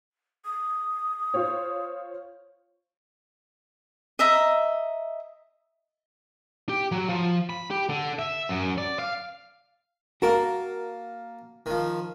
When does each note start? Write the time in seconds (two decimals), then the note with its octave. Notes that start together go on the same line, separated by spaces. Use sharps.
0.45 D#6
1.34 F4 C5 C#5
4.19 D#5 E5 A#5
6.69 G4
6.92 F#3
7.09 F3
7.50 B5
7.71 G4
7.89 D3
8.19 E5
8.49 F#2
8.78 D5
8.99 F5
10.22 A#3 F#4 A#4 A5
11.66 D#3 F3